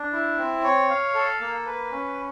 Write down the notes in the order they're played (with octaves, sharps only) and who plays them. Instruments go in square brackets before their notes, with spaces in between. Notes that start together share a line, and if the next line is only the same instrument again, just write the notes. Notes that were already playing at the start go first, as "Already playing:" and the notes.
Already playing: [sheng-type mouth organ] D4
E4
C4
C#5
F5
A4
A#3
B4
C#4